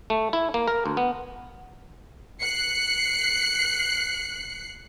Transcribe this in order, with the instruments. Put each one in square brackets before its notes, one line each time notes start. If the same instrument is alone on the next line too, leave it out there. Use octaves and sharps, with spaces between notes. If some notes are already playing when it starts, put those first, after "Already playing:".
[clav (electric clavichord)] A3
E4
A#3
A#4
D2
B3
[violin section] F#6 C7 C#7